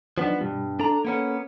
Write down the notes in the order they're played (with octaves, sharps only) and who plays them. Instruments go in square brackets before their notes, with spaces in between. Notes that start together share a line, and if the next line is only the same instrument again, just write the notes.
[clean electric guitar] F3 B3 [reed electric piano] F#3 D4 D#4
[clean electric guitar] G2 [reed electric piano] B2 G3
[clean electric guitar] D4 A#5 [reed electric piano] A4
[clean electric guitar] A#3 B3 C#4